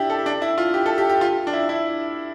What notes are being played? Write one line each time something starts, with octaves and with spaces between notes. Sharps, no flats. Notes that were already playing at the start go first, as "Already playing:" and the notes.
Already playing: D4 E4 G4
A4
D4
E4
F4
G4
A4
G4
G4
F4
D4
E4
E4